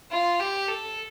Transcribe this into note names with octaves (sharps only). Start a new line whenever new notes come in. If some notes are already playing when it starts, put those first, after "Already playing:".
F4
G4
A4